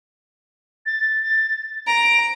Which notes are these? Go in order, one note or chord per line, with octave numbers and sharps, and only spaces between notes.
A6
A6
A#5 D7